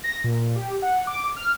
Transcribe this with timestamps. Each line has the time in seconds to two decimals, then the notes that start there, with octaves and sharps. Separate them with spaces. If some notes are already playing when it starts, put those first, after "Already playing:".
0.04 A#6
0.24 A#2
0.56 G4
0.82 F#5
1.07 D6
1.36 F6